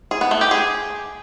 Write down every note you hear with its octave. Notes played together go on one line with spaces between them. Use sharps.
G#4
B3
A3
G4
G#4